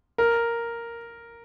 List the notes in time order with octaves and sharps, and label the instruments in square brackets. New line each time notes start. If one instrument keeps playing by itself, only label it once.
[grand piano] A#4